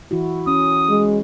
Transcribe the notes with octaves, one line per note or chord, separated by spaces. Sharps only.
E3 E4 F#4
C#4 D#6
G#3